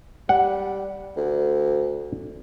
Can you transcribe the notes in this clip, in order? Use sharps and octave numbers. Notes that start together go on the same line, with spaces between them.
G3 F#5
D2